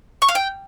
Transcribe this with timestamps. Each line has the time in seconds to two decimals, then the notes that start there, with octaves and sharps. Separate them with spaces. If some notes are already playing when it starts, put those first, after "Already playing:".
0.22 C#6
0.28 F5
0.35 G5